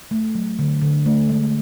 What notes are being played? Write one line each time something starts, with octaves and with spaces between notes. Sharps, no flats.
A3
F#3
D3
D3
A3
G#3